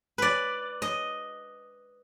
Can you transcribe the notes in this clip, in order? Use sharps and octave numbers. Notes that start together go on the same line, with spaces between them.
B4 D5
D#5